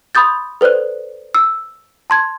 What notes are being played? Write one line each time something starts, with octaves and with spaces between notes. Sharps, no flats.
B5 C6 D#6 G6 A6
A4 B4 C5 D5 F#6
E6
A5 C6 G#6